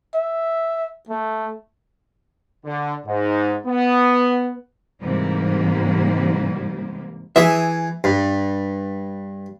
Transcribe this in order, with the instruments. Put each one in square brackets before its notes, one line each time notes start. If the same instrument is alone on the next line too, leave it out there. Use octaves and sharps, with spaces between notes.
[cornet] E5
A3
[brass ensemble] D3
G#2
B3
[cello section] G#2 C3 E3 G3 A#3
[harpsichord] E3 G#4 [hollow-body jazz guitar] E5
[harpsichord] G2